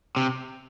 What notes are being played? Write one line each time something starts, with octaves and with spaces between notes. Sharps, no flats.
C3